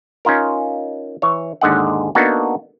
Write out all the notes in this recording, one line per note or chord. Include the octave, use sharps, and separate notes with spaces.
C#4 D#4 F4 A#4
E3 C#5
D#2 G#2 D3 D#5 F#5
A#3 B3 D4 D#4 F#4 A4